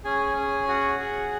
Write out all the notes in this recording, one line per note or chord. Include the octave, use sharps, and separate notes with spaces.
C#4 G#4 G#5
C#4
F#4 G#4 F#5
G#4